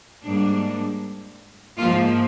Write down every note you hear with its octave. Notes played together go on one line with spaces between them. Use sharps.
G#2 G3 A#3 D4
G#2 F3 A#3 F4